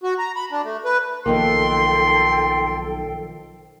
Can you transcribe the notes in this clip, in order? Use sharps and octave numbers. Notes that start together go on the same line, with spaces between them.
F#4
A#5
B5
D4
A3
B4
B1 D#3 F3 A#3 A4 G5 C6